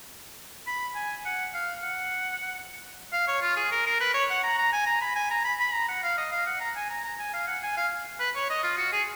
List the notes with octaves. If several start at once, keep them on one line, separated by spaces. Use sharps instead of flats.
B5
G#5
F#5
F5
F#5
F5
C#5
F4
G#4
A#4
A#4
B4
C#5
F#5
A#5
A#5
G#5
A#5
B5
G#5
A#5
B5
B5
A#5
F#5
F5
D#5
F5
F#5
A#5
G#5
A#5
A#5
G#5
F5
F#5
G#5
F5
B4
C#5
D#5
F4
F#4
G#4